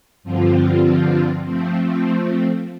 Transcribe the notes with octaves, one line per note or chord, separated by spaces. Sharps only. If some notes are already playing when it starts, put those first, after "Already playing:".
G2 D3 F3 C4 F4
F3 A3 C4